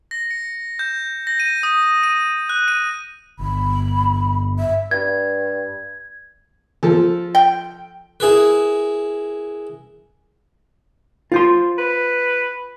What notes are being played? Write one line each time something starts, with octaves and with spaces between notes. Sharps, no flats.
A#6
C#7
G6
A#6
D#7
D#6
D#7
F#6
D#7
G1 B5
E5
G2 G#6
F3 A4
G5
E4 G#4 A#4 B4
F4 C5 C6
B4